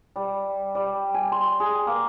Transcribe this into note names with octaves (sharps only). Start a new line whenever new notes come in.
G3
G3
G#5
C6
G#4
A#3